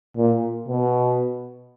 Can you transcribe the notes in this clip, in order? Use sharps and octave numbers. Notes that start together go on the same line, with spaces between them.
A#2
B2